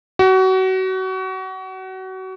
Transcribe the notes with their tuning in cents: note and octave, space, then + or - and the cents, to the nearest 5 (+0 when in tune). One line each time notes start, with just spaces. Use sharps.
F#4 +30